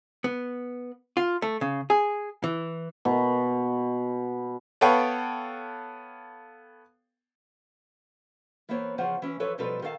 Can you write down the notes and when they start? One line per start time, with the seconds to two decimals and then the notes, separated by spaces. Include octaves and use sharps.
0.24 B3
1.17 F4
1.42 A3
1.61 C#3
1.90 G#4
2.44 E3
3.05 B2
4.81 B3 A4 B4 C#5 F5 G5
8.69 E3 A#3 B3 C5 C#5
8.98 E2 C#3 F3 C5 C#5 F#5
9.22 E3 C#4
9.40 E3 F3 A4 B4 C#5
9.58 F#2 B2 F3 G3 A4 B4
9.82 D#3 A4 D5 F5 A5